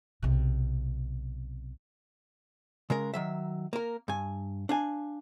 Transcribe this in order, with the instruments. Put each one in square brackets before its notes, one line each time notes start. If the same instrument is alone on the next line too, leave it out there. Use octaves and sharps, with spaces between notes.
[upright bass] B1 C3
[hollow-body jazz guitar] C#3 G#3 A#4
D#3 F#3 E5
A#3 A#4
G2 G#5
D4 F5 G#5